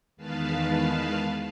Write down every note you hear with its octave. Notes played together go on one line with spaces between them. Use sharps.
E2 D#3 G#3 B4 F5 A5